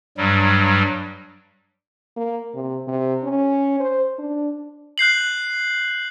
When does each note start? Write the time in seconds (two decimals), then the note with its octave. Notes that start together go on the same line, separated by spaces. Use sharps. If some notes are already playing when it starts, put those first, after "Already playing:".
0.17 G2 F#3 G3
2.16 A#3
2.55 C3
2.88 C3
3.23 C#4
3.80 C5
4.18 D4
4.98 F#6 G6 C7 F#7